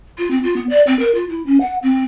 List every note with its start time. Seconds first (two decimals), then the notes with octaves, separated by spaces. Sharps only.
0.18 F4
0.31 C4
0.43 F4
0.56 B3
0.70 D5
0.87 C4
0.99 A#4
1.15 F4
1.29 E4
1.46 C#4
1.61 F#5
1.82 C4